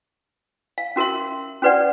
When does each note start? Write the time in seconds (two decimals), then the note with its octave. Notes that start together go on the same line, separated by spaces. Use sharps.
0.78 F5
0.96 C#4 F#4 A#4 E5 C6
1.62 C#4 F#4 B4 D5 F#5